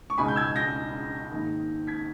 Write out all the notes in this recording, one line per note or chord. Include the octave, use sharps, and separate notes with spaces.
C#6
C#2 B2 G#3 D#4 G#5 B5
G6
E6 G#6
G6 A#6
G#2 D#3 A#3
G#6 B6